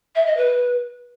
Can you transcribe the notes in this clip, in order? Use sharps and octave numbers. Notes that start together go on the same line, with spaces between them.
E5
D#5
B4